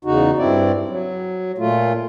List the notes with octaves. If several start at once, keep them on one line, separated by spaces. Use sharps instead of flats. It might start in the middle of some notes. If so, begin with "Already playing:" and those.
E2 C#3 D#4 F#4
G2 C4 E4 D5
F#3
A#2 A3 F4